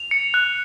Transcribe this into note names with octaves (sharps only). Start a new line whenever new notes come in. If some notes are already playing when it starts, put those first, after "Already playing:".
Already playing: F7
C#7
F#6